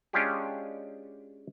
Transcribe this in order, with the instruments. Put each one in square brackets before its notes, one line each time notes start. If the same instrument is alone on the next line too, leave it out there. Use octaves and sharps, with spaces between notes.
[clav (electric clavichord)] G#3 C#4 D4 F4 G4 G#4